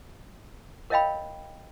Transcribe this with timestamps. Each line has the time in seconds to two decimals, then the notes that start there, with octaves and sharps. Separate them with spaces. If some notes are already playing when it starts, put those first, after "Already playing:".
0.90 A#4 C#5 D#5 F5 G5 B5